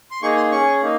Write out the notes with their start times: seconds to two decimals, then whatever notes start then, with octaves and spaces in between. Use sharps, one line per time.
0.11 C6
0.22 A#3 D#4 G#4 C#6
0.37 C6
0.51 C#4 G#4 C#6
0.82 A#3 D#4